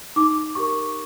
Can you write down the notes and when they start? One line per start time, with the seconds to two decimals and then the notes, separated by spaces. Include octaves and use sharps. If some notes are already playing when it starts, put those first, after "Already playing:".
0.16 D#4 D6
0.55 G4 A#4 C#6